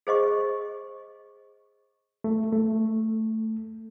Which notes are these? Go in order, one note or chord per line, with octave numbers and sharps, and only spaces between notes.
G#4 C5 D#5 C#6
A3
A3